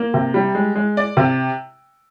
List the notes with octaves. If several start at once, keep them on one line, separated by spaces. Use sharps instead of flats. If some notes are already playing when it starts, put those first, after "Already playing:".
Already playing: A#3
C3
G3
G#3
G#3
D5
C3